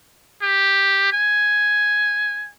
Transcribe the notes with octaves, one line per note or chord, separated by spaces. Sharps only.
G4
G#5